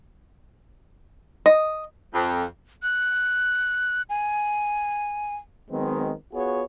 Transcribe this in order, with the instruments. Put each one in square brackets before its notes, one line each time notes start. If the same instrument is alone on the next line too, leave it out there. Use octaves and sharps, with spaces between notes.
[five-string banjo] D#5
[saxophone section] F2
[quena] F#6
G#5
[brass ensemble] D#3 F#3 G#3 B3 C4
B3 F4 F#4 G#4 C#5